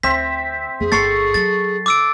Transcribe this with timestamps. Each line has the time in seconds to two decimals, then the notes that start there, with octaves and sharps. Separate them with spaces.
0.03 D2 C4 E5 B6
0.80 F2 G#4
0.92 G1 A4 C#6 A6 C7
1.34 F#3 A6
1.86 D6 E6 D7